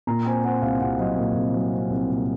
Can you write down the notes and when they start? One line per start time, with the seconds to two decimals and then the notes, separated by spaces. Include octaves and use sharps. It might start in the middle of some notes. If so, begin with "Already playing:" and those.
0.07 A#2 A#5
0.25 C4 G#5
0.44 C4 F#5
0.62 C2 F5
0.81 C2 F#5
0.99 F#3 D#5
1.17 A#2
1.35 C2
1.53 F#3
1.71 C4
1.90 C2
2.08 A#2